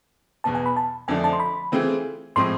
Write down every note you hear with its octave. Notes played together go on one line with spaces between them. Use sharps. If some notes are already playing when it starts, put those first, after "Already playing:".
E2 B2 B3 A5
G#5
B5
A5
F2 D3 F3 A3 D4 G#5
A5
C6
B5
E3 A3 C4 F4 G#4
A2 F3 G#3 C4 G#4 C6